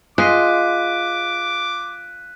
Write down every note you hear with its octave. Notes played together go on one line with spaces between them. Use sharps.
G#3 F4 D6 F#6 B6 D#7